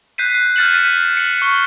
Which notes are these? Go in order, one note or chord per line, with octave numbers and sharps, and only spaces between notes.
F#6 G6 B6 C7 D#7
F#6
F6 G6 A6 C#7 E7 F#7
B6 D#7
C#7 F#7
C#6 G7